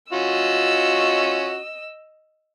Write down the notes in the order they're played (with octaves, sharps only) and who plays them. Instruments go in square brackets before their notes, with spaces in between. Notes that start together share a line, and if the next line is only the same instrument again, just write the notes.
[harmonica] C#4 F4 F#4 [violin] D#5 E6